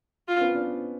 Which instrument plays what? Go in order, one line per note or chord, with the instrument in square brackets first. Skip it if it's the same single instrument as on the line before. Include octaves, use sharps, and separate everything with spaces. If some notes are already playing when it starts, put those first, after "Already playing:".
[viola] F4
[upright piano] C4
B3 C#4
C4 D4